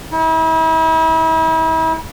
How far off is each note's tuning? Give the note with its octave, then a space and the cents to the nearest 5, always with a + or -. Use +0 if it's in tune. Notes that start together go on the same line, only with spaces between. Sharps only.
E4 -40